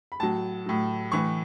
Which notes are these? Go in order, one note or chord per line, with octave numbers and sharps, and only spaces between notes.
B5
A2 F#3 A5
A2 F#3
A2 E3 C#6